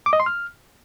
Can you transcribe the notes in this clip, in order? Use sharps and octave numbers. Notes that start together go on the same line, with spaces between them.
D6
D#5
C6
F6